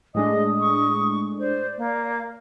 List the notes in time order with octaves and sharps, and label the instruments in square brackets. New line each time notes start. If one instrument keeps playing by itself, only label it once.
[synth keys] A2 G#3 D4 [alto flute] D#5 [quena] D#6
[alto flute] C#6
[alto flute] C5 [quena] D5
[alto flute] A#3